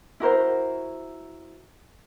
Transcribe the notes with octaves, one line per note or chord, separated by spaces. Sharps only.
E4 F#4 A#4 C5